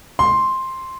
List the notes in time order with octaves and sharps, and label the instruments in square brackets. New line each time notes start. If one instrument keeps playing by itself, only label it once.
[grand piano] C6